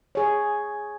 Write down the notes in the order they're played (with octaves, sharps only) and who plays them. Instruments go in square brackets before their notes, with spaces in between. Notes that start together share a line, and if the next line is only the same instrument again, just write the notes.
[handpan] G#4 C#5